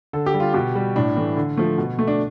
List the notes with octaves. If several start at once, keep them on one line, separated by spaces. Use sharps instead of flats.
D3 A4
G4
G3
F4
B2 G4
G3
A2 D4
E3 A3
D3
F3 A3
B2
A3
D4